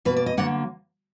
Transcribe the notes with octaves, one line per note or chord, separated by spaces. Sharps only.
B2 A#3 B4
D5
D#5
D3 F#3 A#3 F#5